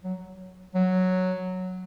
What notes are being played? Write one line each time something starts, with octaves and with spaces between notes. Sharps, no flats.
F#3
F#3